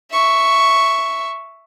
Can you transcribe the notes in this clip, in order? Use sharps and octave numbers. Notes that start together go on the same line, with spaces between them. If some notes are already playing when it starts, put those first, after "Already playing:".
E5 C#6